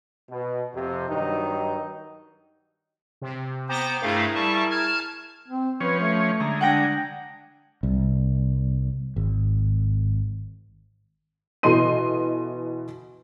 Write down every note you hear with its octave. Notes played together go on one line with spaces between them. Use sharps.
B2
F2 C3
G2 D#3 F#3 D#4
C3
B3 C5 G5 A#5 D6
G2 A3 E4 G#4 A#4 F5
G3 A5 C#6
A5 F6 G#6
C4
F3 C#4 B4 C#5
A3
D3 G#3 A#5
D4 F#5 G5 A#6
C2
G#1
B2 E3 A4 D#5 C6 D#7